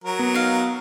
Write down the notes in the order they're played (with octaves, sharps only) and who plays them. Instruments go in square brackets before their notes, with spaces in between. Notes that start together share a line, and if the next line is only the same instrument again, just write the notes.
[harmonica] F#3 A#4
[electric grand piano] B3
[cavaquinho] D#4 F5